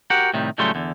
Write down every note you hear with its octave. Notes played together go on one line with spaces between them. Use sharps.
F#4 G4 A#4 F#5
A2 C3 D#3 G3
A2 C#3 F#3 G3 A3 C6
E2 D3